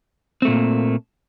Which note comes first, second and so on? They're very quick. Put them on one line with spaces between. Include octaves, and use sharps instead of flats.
C4 A3 A#2 A#3